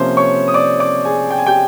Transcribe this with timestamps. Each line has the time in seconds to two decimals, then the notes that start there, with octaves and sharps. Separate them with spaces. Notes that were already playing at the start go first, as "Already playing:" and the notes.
Already playing: C3 F3 A#3 C#4 C5 C6
0.17 C#5 C#6
0.48 D#6
0.54 D5 D6
0.80 D5 D6
1.05 G#4 G#5
1.31 G5
1.39 G#5
1.46 G4 G5